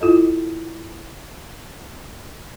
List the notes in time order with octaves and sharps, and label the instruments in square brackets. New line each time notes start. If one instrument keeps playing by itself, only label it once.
[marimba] E4 F4 A4 D#5